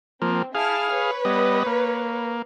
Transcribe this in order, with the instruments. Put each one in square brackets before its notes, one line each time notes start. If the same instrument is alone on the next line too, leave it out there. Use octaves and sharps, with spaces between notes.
[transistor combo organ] F3 A#3 [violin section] C4
[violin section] E4 A5 F6 [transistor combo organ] G#4 F5
[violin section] B4 C#5
[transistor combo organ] G3 B3 D#5
A#3